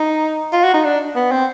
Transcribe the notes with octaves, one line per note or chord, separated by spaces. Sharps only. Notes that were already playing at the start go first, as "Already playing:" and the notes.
Already playing: D#4
F4
F#4
D#4
D4
B3
C4